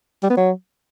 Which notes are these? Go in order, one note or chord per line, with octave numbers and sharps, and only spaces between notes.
G3
B3
F#3